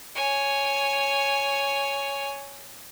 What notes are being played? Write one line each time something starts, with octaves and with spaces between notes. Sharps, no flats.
C#5 G#5